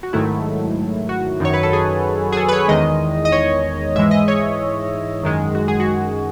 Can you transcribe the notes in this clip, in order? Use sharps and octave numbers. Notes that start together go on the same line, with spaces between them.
F#4
G#2 D#3 F#3 A3 E4
F#4
F#2 D#3 F#3 C#5
B4
A4
G#4
G#4
A4
B4
C#5
E2 D#3 G#3 D#5
D#5
C#5
G#2 E3 G#3 E5
D#5
C#5
F#2 D#3 G#3
F#4
G#4
F#4